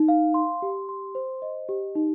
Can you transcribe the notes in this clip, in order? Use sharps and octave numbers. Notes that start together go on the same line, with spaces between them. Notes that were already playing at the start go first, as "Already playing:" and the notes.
Already playing: D#4
F5
C6
G4
C6
C5
D#5
G4
D#4